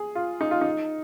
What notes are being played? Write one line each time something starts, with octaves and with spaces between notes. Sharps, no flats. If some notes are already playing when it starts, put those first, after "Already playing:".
Already playing: G#4
F4
D#4
F4
D#4